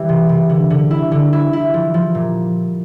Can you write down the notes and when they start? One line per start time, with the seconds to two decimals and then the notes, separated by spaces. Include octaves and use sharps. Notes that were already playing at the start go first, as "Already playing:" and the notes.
Already playing: E3 G3
0.09 C3
0.29 C3
0.49 D3
0.70 D3
0.91 E4
1.11 D3
1.33 E4
1.53 E4
1.74 F3
1.94 F3
2.15 A#2